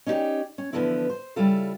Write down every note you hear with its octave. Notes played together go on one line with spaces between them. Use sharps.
C#4 D#4 E4 F#4 G4 D5
C#4
D3 E3 F3 B3 C4 E4
C5
C#3 G3 E4 F4 A4